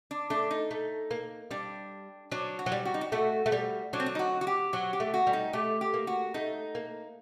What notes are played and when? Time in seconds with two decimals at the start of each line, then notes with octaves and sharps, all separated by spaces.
0.11 D4
0.30 A3 D4
0.51 D#4
0.71 A3
1.11 A#3
1.51 G3 D4
2.32 F#3 D4
2.59 F#4
2.66 F#3
2.72 G3
2.85 F#4
2.94 D#4
3.01 F#4
3.12 A3 F#4
3.46 A3
3.52 G3
3.93 F#3 D4
4.00 C4
4.06 D4
4.15 D#4
4.19 F#4
4.41 F#4
4.47 G4
4.73 F#3 F#4
4.93 G4
5.00 A3
5.14 F#4
5.27 G3
5.33 D#4
5.53 A3 G4
5.81 G4
5.94 A#3
6.07 F#4
6.34 A3 D#4
6.75 A#3